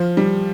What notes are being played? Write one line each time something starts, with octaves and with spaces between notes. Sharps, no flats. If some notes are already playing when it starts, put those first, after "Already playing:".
Already playing: F3
G3